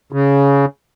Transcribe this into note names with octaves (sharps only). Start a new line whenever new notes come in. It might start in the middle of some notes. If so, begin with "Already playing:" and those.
C#3